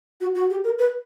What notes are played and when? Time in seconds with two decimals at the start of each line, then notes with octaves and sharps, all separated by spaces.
0.21 F#4
0.35 F#4
0.50 G4
0.64 A#4
0.79 B4